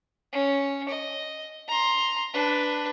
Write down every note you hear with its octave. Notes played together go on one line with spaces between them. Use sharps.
C#4
D#5
A#5 C6
D4 B4